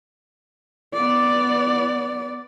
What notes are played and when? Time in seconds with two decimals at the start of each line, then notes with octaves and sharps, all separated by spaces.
0.94 B3 D5